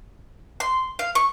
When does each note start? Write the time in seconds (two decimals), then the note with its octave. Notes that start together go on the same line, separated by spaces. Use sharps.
0.60 C6
0.99 F5
1.15 C#6